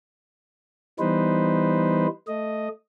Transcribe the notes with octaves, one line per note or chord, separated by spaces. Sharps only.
E3 G3 B3 D#4 B4 C5
A3 D#5